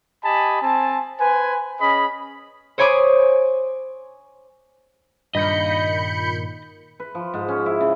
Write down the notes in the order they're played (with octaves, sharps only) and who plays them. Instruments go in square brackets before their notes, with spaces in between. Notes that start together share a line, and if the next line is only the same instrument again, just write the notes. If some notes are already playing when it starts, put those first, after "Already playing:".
[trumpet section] G4 D#5 G#5 A5 B5
C4 G#5 A5
B4 C5 G#5
C#4 G#4 D#5 B5
[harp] C5 C#5 G#5 B5 D6 D#6
[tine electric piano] G2 [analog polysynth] A#2 D#3 [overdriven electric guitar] D#5 [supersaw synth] B5 G6 C#7
[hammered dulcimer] B4
F3
G#2
C#4
E4
C#3